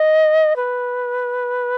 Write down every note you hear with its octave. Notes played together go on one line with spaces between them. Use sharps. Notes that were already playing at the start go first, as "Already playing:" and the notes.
Already playing: D#5
B4